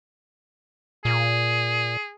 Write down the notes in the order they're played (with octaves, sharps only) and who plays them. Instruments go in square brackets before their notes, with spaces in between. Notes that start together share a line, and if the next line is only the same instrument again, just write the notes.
[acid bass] A#2 [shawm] G#4